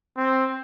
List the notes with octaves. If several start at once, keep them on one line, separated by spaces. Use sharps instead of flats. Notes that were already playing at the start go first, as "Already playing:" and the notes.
C4